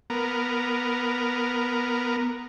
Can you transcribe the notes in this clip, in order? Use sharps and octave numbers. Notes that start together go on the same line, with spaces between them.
B3 A#4